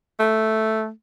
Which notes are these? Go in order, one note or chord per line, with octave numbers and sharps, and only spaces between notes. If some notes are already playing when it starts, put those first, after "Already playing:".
A3